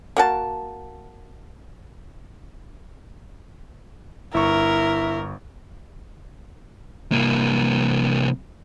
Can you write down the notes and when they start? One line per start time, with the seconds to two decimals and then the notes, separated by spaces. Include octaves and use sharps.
0.17 A#3 F#4 A5
4.34 G1 E4 A#4 C#6
7.12 C2 A#3